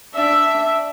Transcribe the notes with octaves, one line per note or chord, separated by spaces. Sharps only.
D4 E5